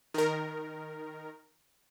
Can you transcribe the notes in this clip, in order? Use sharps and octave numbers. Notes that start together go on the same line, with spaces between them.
D#3 A#4